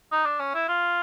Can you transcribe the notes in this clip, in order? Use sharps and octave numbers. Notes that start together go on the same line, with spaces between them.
D#4
D4
C#4
E4
F4